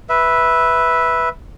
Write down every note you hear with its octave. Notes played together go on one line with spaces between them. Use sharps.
B4 E5